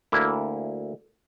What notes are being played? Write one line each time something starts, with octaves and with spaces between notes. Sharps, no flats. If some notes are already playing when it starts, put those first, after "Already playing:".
D2 A#3 E4